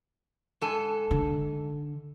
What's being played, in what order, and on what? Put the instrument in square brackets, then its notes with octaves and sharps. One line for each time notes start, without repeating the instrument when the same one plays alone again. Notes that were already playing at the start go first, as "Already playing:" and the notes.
[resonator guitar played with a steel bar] G#2 A4 G#5
[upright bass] D3